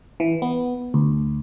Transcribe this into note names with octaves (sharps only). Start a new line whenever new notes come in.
E3
B3
D2